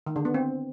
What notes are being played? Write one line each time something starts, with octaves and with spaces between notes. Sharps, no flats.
D#3
D3
B3
C4